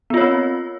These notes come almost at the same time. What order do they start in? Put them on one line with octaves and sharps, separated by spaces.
B3 F4 C#5 C4